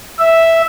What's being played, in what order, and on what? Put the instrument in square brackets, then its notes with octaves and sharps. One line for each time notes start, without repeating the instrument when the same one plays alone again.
[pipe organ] E5